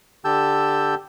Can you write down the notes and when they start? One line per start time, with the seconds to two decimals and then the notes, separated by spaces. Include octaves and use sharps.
0.25 D3 G4 A5 E6 G6